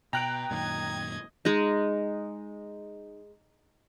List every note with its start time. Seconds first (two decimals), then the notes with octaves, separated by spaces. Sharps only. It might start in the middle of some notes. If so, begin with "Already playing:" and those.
0.13 B2 G5 A#5 F#6 D7
0.51 F#2 A#2 D#3 D#5 G#6
1.45 G#3 D#4